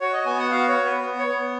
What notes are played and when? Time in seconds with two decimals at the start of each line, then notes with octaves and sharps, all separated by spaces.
0.01 F#4 C#5
0.13 D#5
0.26 B3 G#5
0.39 F#5
0.51 F#4 F5
0.68 C#5
0.77 B3
0.85 B4
1.01 B3
1.19 C#5
1.27 B3